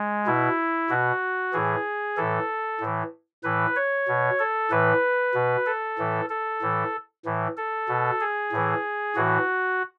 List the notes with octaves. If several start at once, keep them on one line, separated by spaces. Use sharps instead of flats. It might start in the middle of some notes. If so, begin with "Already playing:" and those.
Already playing: G#3
B2 E4
B2 F#4
A2 E3 G#4
A2 E3 A4
A2 E3
A2 E3 B4
C#5
B2
A4
A2 E3 B4
B2
A4
A2 E3
A4
A2 E3
A2 E3
A4
B2
G#4
A2 E3
A2 E3 F#4